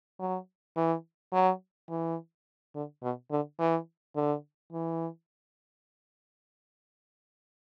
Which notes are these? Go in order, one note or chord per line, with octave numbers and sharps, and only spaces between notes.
F#3
E3
F#3
E3
D3
B2
D3
E3
D3
E3